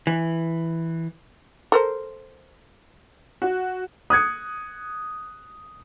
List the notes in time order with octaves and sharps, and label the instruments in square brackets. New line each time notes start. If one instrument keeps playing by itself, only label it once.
[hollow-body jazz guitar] E3
[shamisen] A4 A#4 C5
[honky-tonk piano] F#4
[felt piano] D#6 F#6 G#6 C#7